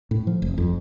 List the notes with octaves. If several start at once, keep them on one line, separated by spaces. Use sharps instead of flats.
A2
F3
F1
F2